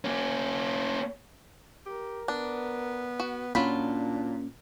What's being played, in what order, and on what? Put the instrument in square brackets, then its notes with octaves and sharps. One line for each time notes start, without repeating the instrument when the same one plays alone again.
[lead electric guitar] A#3 C#4
[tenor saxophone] G4 [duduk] A#4
[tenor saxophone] B3 [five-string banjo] D4
[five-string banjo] F#4
[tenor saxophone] A#2 [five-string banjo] F#3 F4 B5 [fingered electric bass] A#3 B3 C#4 [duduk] D4